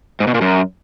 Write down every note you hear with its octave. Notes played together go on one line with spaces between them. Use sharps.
G#2
B2
A#2
F#2